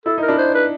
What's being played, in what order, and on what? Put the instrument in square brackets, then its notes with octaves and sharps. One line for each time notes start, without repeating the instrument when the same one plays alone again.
[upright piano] E4 [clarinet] A4
[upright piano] D#4 [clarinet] A#4
[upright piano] D4 E4
[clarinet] C5
B4